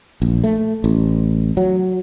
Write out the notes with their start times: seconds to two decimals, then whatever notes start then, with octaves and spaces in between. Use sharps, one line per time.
0.22 A#1
0.44 A3
0.84 A1
1.57 F#3